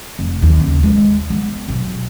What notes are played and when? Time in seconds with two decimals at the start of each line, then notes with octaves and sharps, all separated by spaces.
0.19 F1
0.42 D#2
0.60 C#3
0.83 G#3
1.30 B3
1.68 B1